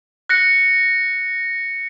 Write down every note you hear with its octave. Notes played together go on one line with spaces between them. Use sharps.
F#6 A#6 C#7